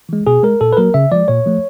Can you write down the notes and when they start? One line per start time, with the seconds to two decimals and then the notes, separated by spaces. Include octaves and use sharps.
0.09 E3 G#3
0.27 B2 G#4
0.43 G#3 A#4
0.61 A#2 A4
0.73 B4
0.77 F#3 A#3 A#4
0.94 C#3 E5
1.12 F3 G#3 D5
1.28 A#2 C#5
1.46 F3 A3